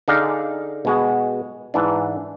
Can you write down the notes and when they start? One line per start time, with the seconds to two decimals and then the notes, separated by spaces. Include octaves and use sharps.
0.08 D3 D#4 G#4 D5 F5
0.85 B2 G#3 F#4
1.74 G#2 E3 D4